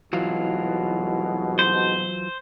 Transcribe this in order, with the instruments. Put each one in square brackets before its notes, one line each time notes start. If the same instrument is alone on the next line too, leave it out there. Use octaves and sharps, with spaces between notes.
[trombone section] C2 G#2 B2 [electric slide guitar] E3 F#3 F4
[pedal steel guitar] C5